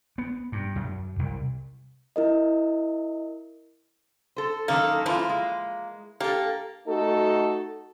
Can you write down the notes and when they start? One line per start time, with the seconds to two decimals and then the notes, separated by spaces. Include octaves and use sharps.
0.18 B3
0.52 G2
0.76 F#2
1.19 C2
2.16 E4 A#4 D#5
4.36 A4 C5
4.68 F#2 D#3 A#3 A4
5.06 F#2 E3 F3 A#3 E4 F4
5.29 G#3
6.20 A#3 G4 A4
6.86 A3 D#4 F#4 A4